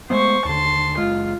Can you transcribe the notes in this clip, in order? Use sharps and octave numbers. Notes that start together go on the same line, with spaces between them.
G#3 A3 B3 C5 C#6
D#2 D3 A5 C6
F#1 G#3 F4